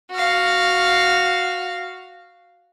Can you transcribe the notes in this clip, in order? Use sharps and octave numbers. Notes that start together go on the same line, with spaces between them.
F#4 F5